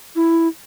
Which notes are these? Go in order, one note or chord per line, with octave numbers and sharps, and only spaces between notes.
E4